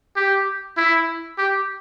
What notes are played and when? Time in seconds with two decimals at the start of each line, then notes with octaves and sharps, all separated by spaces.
0.16 G4
0.77 E4
1.38 G4